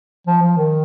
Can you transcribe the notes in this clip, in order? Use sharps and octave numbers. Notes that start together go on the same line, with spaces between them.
F3
F3
D#3